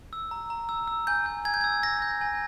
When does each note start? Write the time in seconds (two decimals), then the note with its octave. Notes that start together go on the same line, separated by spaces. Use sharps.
0.13 E6
0.31 A#5
0.50 A#5
0.69 E6
0.88 E6
1.07 G#5 G6
1.26 G6
1.45 G#5 G#6
1.54 G6
1.61 G#6
1.64 E6
1.83 E6 A#6
2.02 G6
2.21 G#5